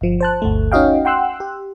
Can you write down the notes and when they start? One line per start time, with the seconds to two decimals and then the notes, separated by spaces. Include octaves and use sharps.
0.01 G1 F3
0.21 C5 A5 F#6
0.42 G1 D2 A3
0.72 C#4 D#4 F#4 D#5 F5 G5
1.05 F#5 G5 C6 E6 F#6
1.40 G4